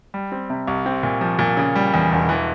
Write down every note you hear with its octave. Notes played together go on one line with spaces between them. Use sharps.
G3
C4
C3
C2
C4
A#2
F3
A#2
C#3
G3
E2
E1
E3